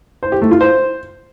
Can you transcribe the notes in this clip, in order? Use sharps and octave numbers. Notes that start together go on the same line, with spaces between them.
C5
G4
A3
F4
C5